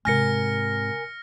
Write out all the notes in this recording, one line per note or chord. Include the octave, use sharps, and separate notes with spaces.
G#2 C3 A#4 G#5 F6 A#6 C#7